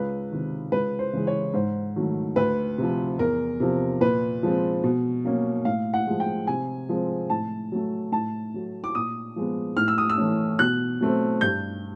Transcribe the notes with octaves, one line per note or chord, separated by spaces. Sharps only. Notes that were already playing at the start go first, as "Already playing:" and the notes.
Already playing: C#2 B4
C3 D#3
C#2 B4
C5
C#3 E3 G#3
C#5
G#2 C5
D#3 F#3 A3
D2 B4
C3 F3
E2 A#4
C3 F3
A#2 B4
F3 G#3 C4
B2
F#3 A#3 C#4
A2 F5
F#5
F3 G#3
G5
C3 G#5
F3 G#3 C4
A2 A5
F#3 A3
A2 A5
F#3 A3
D6
A#2 D#6
F3 G#3 B3
A2 F6
E6
D#6
E6
E3 A3 C#4
B2 F#6
F#3 A3 C4
G2 G6